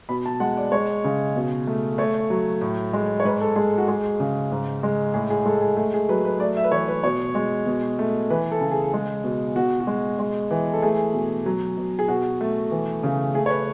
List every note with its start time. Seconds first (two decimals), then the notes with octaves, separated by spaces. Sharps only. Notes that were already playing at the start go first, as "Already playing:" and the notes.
0.09 B2 B5
0.26 A5
0.40 G#3 F#5
0.57 D5
0.72 G#3 C#5
1.04 C#3
1.36 B2
1.67 A3
1.98 A3 C#5
2.30 F#3
2.61 A2
2.93 G#3
3.20 C#5
3.25 G#2 B4
3.41 A4
3.56 G#3 G#4
3.78 F#4
3.88 G#3 G#4
4.20 C#3
4.52 G#2
4.83 G#3
5.14 A2 G#4
5.30 G#4
5.46 G#3 A4
5.61 G#4
5.77 A3 G#4
5.94 G#4
6.09 F#3 B4
6.25 B4
6.40 A3 D5
6.57 E5
6.64 B4
6.72 E3 C#5
6.88 B4
7.04 B2 C#5
7.35 G#3
7.66 B2
7.99 A3
8.30 E3 B4
8.51 A4
8.61 C#3
8.71 G#4
8.93 G#3
9.24 B2
9.56 B2 F#4
9.80 F#4
9.87 G#3
10.19 G#3
10.51 E3
10.73 A4
10.82 A3 G#4
11.14 B2
11.46 F#3
11.78 B2
11.99 G#4
12.08 B2 F#4
12.41 A3
12.71 E3
13.03 C#3
13.34 A3 G#4
13.46 C#5
13.50 B4